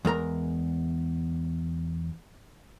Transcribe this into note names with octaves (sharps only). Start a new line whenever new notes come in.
E2 G#3 A#4 A#5